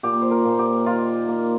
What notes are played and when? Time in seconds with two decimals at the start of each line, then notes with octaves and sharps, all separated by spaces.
0.03 A#2 G4
0.21 C5
0.31 A#4
0.45 A#2
0.59 G4
0.86 D#3 F4
1.28 A#3